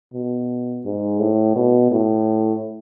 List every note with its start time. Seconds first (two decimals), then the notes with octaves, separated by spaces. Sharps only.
0.14 B2
0.85 G#2
1.20 A2
1.56 B2
1.92 A2